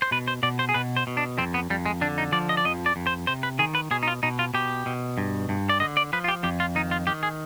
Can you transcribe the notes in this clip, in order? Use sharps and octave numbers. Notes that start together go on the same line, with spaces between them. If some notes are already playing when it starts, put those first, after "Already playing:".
C5
B2 B4
C5
B2 D5
C5
G#4
B2 B4
C5
B2
D4
F2 C4
B3
F2 G3
G#3
D3 D4
D#4
F3 D5
D#5
D5
F2 D#5
D5
F2
C5
C3 C5
B4
D#3 G#4
B4
B2 G#4
D#4
F4
B2 D#4
F4
B2 G4
B2
G2
G2
D5
D3 D#5
D5
F3 B4
F4
G4
F2 G4
F4
D#3 D#4
F4
D#3 G4
G#4